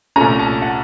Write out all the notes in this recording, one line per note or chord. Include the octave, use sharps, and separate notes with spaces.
C2 A#2 A3 C#4 A#5
A5
F#5